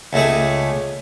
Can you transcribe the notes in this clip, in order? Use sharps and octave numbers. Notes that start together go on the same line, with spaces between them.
C#2 A3 G#4